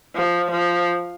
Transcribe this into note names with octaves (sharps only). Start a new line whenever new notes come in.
F3
F3